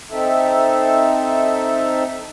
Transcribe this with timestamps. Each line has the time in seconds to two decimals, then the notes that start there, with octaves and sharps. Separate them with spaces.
0.11 C4 D#4 A4 E5